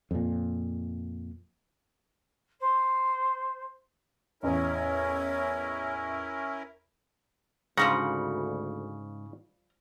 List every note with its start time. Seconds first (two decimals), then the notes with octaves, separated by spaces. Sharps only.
0.11 F2 A#2
2.60 C5
4.43 A1 E2 C#4 E4 A#4 C#5
7.77 D2 G#2 C#3 F3 G3 F#5 A#5